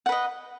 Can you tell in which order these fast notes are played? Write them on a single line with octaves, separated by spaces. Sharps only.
F#5 B4 D#5